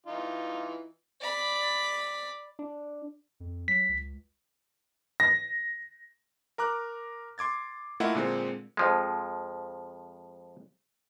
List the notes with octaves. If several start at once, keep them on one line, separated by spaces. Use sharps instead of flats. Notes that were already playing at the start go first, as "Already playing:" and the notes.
E3 D#4 F4
D5 B5
D4
F2
F#3 B6
C#2
A#6
A#4 A#5 D6 F#6
C6 D6 G#6 A6
A3 A#3 E4 F4 D#5 F#5
A#2 D3 G#3 C4
F2 F3 G#3